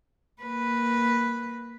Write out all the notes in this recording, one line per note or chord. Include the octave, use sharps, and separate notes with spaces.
A#3 B4